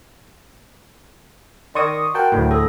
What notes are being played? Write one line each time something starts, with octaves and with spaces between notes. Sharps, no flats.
D#3 D5 C6 C#6 D#6
F#4 A#4 G5 A5
D2 A2 F#3
G#4 A4